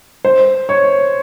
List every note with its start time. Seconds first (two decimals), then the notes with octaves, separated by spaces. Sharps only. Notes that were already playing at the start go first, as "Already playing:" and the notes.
0.25 C5
0.69 C#5